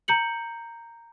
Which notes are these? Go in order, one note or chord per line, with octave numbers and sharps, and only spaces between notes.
A#5 G6 C#7 F#7